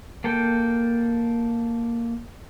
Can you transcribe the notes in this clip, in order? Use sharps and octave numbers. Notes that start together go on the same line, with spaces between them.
A#3 A4 G5